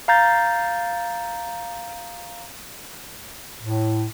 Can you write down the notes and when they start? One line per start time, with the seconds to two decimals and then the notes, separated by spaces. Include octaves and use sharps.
0.08 F5 A#5 G6 A6
3.61 A2